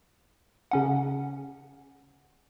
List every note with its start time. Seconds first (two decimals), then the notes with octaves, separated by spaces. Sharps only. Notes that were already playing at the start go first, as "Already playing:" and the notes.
0.71 C#3 C#4 F#5